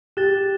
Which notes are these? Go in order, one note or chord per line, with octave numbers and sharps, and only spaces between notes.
G4 F#6 A6 E7 G7